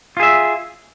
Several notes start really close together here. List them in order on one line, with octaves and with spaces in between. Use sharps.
F4 G#4 E5